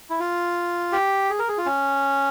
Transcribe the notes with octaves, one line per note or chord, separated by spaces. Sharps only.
E4
F4
G4
G#4
A#4
G#4
F4
C#4